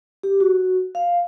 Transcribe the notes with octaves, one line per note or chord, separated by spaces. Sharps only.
G4
F#4
F5